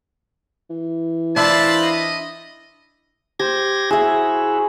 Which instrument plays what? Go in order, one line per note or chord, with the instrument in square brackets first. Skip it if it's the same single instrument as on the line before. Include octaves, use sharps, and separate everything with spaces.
[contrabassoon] E3
[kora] D4 E4 [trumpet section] F4 C5 B5 [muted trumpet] A5
[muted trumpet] D#5
[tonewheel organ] G4 G#6 A#6 [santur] C5
[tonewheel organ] E4 F#4 [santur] G#4 E5